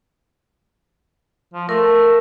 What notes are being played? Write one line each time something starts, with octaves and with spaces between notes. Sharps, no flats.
F3
A3 A#4